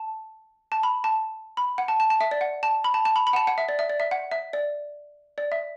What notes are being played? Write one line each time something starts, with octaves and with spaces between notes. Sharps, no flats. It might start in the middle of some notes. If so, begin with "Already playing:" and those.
Already playing: A5
A5
B5
A5
B5
F#5
A5
A5
A5
E5
D5
F#5
A5
B5
A5
A5
B5
B5
F#5
A5
F#5
E5
D5
E5
D5
E5
F#5
E5
D5
D5
E5